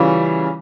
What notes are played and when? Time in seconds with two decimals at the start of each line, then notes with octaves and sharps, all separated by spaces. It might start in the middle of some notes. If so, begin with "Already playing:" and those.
Already playing: C#3 E3 G3 C#4 F4